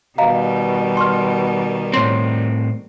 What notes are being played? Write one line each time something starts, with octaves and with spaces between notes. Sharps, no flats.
B2 D#3 G3 D#5 F5 A#5
C6 C#6 F6
A2 C4 C#5 C6